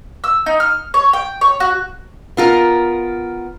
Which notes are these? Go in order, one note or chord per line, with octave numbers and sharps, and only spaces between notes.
E6
D#4
F6
C#5
G5
C#5
F#4
B3 F4 A#4